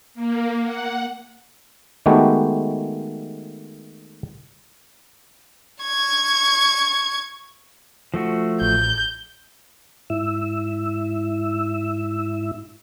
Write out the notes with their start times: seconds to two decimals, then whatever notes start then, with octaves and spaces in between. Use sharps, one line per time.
0.14 A#3
0.63 F#5
2.06 D#3 G#3 A3 B3 F#4 G4
5.83 C#6 G#6
8.14 F3 A3 F#4
8.61 A1 G6
10.10 G#2 E4 E6